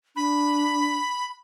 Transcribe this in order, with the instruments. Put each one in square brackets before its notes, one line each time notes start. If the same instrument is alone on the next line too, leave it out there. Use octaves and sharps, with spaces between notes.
[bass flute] D4 [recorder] B5